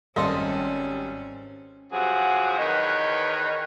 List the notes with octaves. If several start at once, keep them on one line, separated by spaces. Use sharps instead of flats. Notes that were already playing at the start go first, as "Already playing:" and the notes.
G#1 G3 C#4 A4 D#5 F5 C6 E6
G2 C3 F3 F#3 G#4 F#5
E2 D#3 B4 C#5 D#5